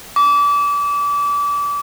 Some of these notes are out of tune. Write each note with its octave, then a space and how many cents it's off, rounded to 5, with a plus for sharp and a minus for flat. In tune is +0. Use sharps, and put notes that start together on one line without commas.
D6 -30